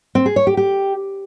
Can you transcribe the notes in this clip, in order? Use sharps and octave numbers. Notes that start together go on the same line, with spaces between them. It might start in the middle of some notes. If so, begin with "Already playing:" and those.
C4
G#4
C#5
G4
G4